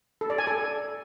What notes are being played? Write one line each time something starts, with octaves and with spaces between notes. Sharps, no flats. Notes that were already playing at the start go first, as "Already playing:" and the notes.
A4
D5
G#5
A4